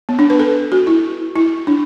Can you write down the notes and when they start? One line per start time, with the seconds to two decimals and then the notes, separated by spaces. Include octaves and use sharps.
0.09 B3
0.19 D4
0.30 B4
0.39 A4
0.72 F#4
0.87 E4
1.36 E4
1.67 D4